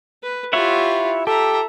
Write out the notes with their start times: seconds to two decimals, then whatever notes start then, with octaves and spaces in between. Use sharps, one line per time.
0.23 B4
0.53 E4 F4 G4 C#5 E5 F#5
1.27 G4 A4 E5 A#5